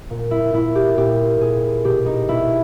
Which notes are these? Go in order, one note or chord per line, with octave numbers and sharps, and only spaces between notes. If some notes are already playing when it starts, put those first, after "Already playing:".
A#2
E4
A#2 E4
G4
A#2 G4
A#2 G#4
B2 G4
D#4
B2 E4